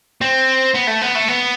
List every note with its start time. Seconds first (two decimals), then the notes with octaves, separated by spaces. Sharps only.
0.21 C4
0.75 B3
0.88 A3
1.02 B3
1.15 A3
1.28 B3